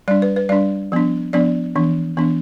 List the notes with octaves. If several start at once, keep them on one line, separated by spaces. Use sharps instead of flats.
G3 D4 D5
B4
B4
G3 D4 D5
F3 B3 D4
F3 B3 D4 D5
E3 B3 D4
E3 B3 D4